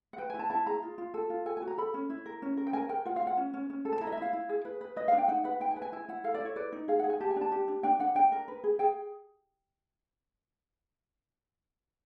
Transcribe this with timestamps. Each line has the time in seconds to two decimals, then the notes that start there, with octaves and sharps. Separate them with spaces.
0.13 F#5
0.18 B4 G5
0.30 E4 G#5
0.39 A5
0.50 E4 A5
0.66 G#4 A#5
0.83 F4
0.98 F4
1.14 A4
1.30 F4
1.46 A4 G#5
1.57 G#5
1.62 F#4
1.68 A#5
1.78 A4 B5
1.94 C#4
2.10 E4
2.26 A#4
2.42 C#4
2.57 A#4
2.67 G5
2.73 A#4 G#5
2.89 A#4 G5
3.05 F4 F#5
3.16 F5
3.22 F4
3.27 F#5
3.37 C#4
3.54 C#4
3.70 C#4
3.85 A4
3.93 A5
4.01 E4 A#5
4.07 D#5
4.12 E5
4.17 E4 F5
4.33 E4
4.49 G#4
4.65 B4
4.81 B4
4.96 B4 D#5
5.08 F5
5.13 D4
5.18 G5
5.28 D#4 F#5
5.44 B4 F#5
5.60 D#4 G5
5.71 G#5
5.76 B4
5.82 G#5
5.92 E4 G#5
6.09 E4 F#5
6.24 A4 F5
6.34 D5
6.40 E4
6.45 C#5
6.56 B4 D5
6.72 D#4
6.88 G#4 F5
6.99 G#4 F#5
7.10 G#5
7.20 G4 A5
7.31 G#5
7.36 D4
7.41 A5
7.52 G4
7.68 D4
7.83 D4 G5
8.00 D4 F#5
8.15 D4 G5
8.32 A#4
8.48 B4
8.64 G#4
8.79 G#4 G5